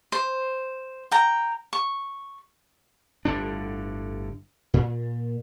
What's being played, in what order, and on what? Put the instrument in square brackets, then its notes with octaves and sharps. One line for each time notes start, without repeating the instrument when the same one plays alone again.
[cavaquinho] C5
G5 A#5
C#6
[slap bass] G1 A2 D3 D4
A#2